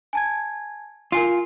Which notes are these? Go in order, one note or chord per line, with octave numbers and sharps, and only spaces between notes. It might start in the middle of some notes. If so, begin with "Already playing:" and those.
G#5 A5 G#6
F4 A#4 G#5 C7